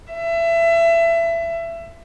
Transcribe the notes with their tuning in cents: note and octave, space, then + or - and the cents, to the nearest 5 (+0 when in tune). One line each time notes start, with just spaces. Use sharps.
E5 +25